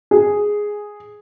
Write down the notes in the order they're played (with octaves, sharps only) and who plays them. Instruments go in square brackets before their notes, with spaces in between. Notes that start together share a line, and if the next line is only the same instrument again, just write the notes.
[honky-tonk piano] G#4